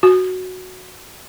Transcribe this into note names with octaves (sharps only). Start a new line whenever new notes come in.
F#4